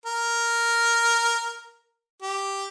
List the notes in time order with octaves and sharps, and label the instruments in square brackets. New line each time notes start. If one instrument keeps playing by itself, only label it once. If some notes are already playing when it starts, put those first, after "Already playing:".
[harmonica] A#4
G4